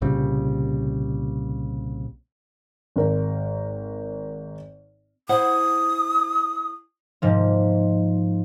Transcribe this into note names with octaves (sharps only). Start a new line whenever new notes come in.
C2 A#2 C#3 G3
G#1 A#4
E4 C5 F#5 D#6
G#2 F3 A#3